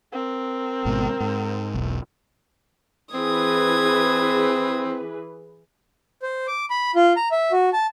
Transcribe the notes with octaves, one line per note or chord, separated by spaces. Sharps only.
C4 A#4
G#1 G#2 B2
G#2
E1 B1
E3 C4 G#4 B4 D#6 G#6
C5
D6
B5
F4
A#5
E5
F#4
A5